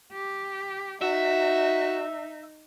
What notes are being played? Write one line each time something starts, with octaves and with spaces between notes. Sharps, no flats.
G4
D#4 F#4 E5